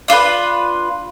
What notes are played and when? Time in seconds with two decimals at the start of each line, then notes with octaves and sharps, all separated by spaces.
0.08 D4 F4 A#4 B4